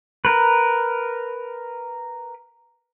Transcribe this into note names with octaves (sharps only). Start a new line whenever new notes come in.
A#4 B4